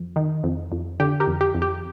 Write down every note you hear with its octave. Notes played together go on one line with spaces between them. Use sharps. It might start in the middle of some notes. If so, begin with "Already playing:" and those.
Already playing: F2
D#3
F2
F2
D3 G4
G4 A#4
F2
G4
F2
G4